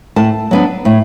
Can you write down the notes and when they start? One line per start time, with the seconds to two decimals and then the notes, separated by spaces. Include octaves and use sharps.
0.16 A2 A5
0.51 F#3 B3 D4
0.85 A2